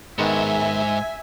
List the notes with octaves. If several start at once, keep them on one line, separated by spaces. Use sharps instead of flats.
G#2 D#3 G#3 B3 E5 G#5